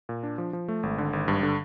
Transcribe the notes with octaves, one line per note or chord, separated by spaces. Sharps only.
A#2
D4
F3
F3
A3
G#1
D3
G#1
G2
D3